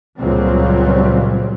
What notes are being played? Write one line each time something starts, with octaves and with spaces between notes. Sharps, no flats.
C#2 A#2 F#3 G3 C4